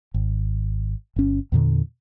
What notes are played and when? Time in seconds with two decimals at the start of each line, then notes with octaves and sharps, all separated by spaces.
0.14 G#1
1.16 G1 C#4
1.52 E2 A#2 D3